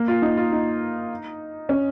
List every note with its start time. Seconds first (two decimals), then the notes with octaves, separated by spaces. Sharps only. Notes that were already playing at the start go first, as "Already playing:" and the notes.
Already playing: A#3
0.08 F4
0.22 D#4
0.37 F4
0.52 D#4
1.69 C#4